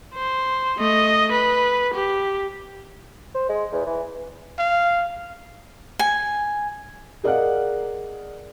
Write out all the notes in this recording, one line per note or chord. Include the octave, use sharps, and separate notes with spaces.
C5
A3 D#5
B4
G4
C5
G#3
E2
E3
F5
G#5
G#4 A#4 D5 D#5 F5 F#5